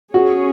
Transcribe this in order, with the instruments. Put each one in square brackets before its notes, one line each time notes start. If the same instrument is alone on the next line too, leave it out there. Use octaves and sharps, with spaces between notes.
[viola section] C#4 G#4 C#5 [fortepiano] F#4